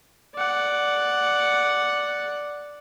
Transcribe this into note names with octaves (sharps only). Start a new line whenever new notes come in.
D5 F#5